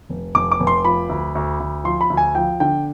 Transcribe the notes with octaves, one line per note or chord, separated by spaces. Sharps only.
F1
F1 D6
D6
F1
C6
F3 B5
D2
D2
D2
F3 C6
B5
D2
G#5
F3 G5
D3 G5